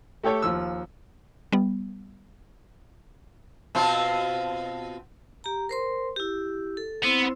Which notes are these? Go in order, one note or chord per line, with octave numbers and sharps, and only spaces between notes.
A3 G4 A4 C#5 G5
D#2 F3 E6
G3 B3
B2 C4 F4
G4 A#5
A#4 C5 C6
E4 G4
A4
B3 C4 E4 C5